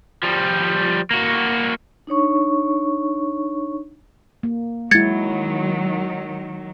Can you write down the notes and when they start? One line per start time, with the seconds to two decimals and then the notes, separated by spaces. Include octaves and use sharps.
0.23 F3 G3
1.11 A#3 F#4
2.07 D4 D#4 C#5 C#6
4.43 A#3
4.91 D#3 F#3 G#3 E4 G#6 A6 C#7